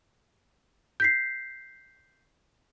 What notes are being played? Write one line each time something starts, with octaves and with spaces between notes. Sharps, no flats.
G6 B6 C7